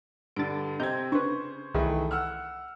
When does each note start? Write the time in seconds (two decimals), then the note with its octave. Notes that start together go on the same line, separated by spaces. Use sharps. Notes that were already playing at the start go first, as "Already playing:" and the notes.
0.36 G2 D3 A6 D7
0.80 C3 C4 D#5 A#5 G6 G#6
1.12 C#3 D4 B4 C5 C#6
1.74 C2 D#3 E3 A3 G#4
2.11 F#5 E6 F6